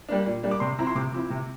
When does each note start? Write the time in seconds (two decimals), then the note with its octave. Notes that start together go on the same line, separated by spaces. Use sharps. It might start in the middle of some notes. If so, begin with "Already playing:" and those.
0.09 G3 A#3 D4
0.26 A#2
0.43 G3 A#3 D4
0.51 D6
0.60 C3 C6
0.79 F3 C4 E4 A#5
0.87 C6
0.95 C3 D6
1.13 F3 C4 E4
1.30 C3